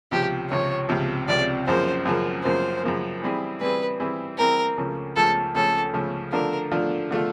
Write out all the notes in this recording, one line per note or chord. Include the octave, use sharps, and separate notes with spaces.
C#2 C3 F3 G4
C#2 C3 F3 C#5
C#2 C3 F3
C#2 C3 F3 D5
F#2 C#3 F3 A#3 C5
F#2 C#3 F3 A#3
F#2 C#3 F3 A#3 C5
F#2 C#3 F3 A#3
E3 G3 C4 E4 G#4
E3 G3 C4 E4 G#4 B4
E3 G3 C4 E4 G#4
E3 G3 C4 E4 G#4 A#4
C#2 C#3 F3 A3 C#4
C#2 C#3 F3 A3 C#4 A4
C#2 C#3 F3 A3 C#4 A4
C#2 C#3 F3 A3 C#4
D3 F3 A3 D4 F4 A#4
D3 F3 A3 D4 F4
D3 F3 A3 D4 F4